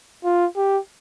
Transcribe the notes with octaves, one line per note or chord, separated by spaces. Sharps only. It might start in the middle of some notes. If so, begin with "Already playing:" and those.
F4
G4